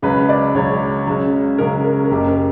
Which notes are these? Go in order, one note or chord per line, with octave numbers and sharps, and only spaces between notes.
C#2 C#3 F#3 B4
D5
C#2 C#3 F#3 C#5
C#2 C#3 F#3
C#2 C#3 F#3 A#4
A#4
A#4
F#1 F#2 C#3 G4
A#4